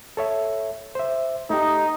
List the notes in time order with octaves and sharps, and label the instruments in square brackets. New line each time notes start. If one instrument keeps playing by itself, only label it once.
[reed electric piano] A4 C#5 E5
C5 E5
[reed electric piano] A3 G4 [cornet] D#4